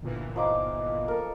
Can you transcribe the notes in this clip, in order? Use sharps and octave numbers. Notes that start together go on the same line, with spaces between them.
G1 A#2 E3
F3 D#4 D6
A4 A#4